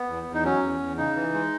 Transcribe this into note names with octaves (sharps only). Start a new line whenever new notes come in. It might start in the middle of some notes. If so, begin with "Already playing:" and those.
Already playing: B3
E2
E2
D#4
F#3 C#4
E2
E2
C#3 D#4
E3
G#3